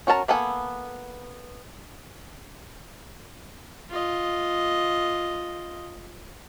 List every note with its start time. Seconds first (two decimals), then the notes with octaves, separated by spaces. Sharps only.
0.07 C#4 F#4 A#4 A5 A#5
0.28 A#3 B3 A4 G#5
3.90 F4 D#5